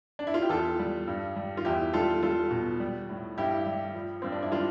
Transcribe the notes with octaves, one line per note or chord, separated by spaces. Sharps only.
D4
E4
F4
G4
E2 F4 A4
G3
G2
G3
F4
E2 E4 G4
G3 F4 A4
G3 F4 A4
B2
G3
A2
G2 E4 G4
G3
F3
G2 C4
D4
E4
G3 D4 F4